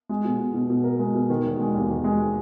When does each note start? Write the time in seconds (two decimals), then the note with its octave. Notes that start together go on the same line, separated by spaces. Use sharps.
0.09 G#3
0.25 B2
0.39 B2
0.54 B2
0.70 B2
0.84 A#4
0.99 G#3
1.15 B2
1.30 D#3
1.45 E1
1.60 G#3
1.75 D#2
1.90 D#3
2.04 G#3